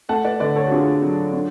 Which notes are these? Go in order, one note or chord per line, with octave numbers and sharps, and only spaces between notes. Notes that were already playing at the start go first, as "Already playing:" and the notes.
A3 F#5 A5
B4 D5
D3 B4 D5
A4 C#5
F#4
D4 F4 G#4
F#3
D4